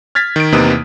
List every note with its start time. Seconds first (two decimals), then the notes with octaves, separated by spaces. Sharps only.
0.15 F6 G#6 A6 B6
0.36 D#3 D7
0.52 E2 C3 A#3 D#4 B4 D#6